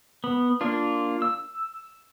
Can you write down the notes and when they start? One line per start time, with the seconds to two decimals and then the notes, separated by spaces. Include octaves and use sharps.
0.24 B3
0.61 A#3 D4 F4
1.22 E6